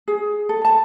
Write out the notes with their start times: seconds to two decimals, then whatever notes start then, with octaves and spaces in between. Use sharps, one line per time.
0.08 G#4
0.49 A4
0.65 A5